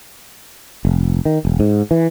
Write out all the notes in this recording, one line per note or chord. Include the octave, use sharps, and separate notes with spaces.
F1
D#3
E1
G#2
E3